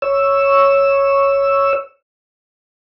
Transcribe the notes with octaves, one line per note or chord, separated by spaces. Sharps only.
C#5 E6